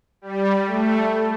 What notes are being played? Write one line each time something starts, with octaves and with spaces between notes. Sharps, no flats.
G3
A3